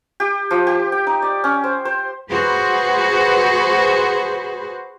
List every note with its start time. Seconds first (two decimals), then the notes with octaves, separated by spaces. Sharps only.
0.20 G4
0.51 F3
0.67 G4
0.92 G5
1.07 D#4
1.22 D5
1.44 C#4
1.64 C5
1.85 C5
2.30 F#4 G#4 B4 C5